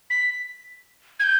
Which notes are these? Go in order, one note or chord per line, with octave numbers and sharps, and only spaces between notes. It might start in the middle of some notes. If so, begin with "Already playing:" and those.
B6
G#6
G6